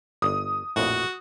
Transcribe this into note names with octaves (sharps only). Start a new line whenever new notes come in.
G1 D#6
A#1 F2 A2 F#4